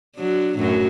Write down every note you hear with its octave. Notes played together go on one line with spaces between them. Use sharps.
F#3 D4
F#2 A2 F#3